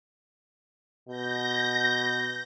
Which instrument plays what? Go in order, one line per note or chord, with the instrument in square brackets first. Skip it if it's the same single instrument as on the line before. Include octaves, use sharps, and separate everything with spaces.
[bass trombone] B2 [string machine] G6 A#6